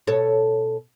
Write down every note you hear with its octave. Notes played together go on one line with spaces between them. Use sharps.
B2 A4 C#5